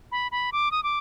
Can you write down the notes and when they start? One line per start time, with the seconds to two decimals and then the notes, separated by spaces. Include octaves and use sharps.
0.12 B5
0.32 B5
0.52 D6
0.71 D#6
0.83 D6